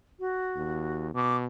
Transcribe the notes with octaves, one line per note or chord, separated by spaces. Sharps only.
F#4
D#2
B2 D6